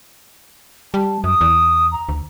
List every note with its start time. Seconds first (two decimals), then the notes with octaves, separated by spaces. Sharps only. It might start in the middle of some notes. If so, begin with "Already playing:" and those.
0.94 G3 A5
1.24 F#2 D#6
1.41 E2
1.92 A#5
2.09 D2